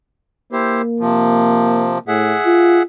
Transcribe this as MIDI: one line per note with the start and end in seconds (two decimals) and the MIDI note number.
0.52 2.01 58
0.52 0.82 64
0.52 0.82 67
0.52 0.82 72
1.00 1.99 48
1.00 1.99 53
2.08 2.37 45
2.08 2.83 68
2.08 2.83 76
2.08 2.83 78
2.46 2.82 65